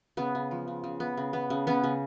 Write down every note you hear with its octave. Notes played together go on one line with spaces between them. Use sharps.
C#3 B3
C#3
F3
C#3
C#3
B3
C#3
B3
C#3
B3 C#4
C#3